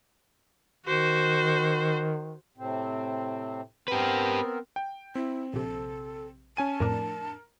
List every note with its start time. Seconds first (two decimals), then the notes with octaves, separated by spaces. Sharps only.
0.86 D#3 F#4 C5
2.57 A2 C3 C4
3.88 B3 C4 G4 A#4 B4
4.76 G5
5.15 C4 E4
5.53 A#1 C3 A4
6.57 C#4 G#5 A5 D#7
6.80 F2 A2 D4 A#4